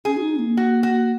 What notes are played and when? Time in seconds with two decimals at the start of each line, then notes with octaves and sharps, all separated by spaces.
0.05 C#4 G#4
0.17 F#4
0.22 D#4
0.36 C#4
0.39 A#3
0.57 F#4
0.83 F#4